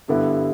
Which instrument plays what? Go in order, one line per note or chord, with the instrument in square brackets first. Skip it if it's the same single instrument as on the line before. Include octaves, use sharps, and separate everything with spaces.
[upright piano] G2 D3 G3 B3 E4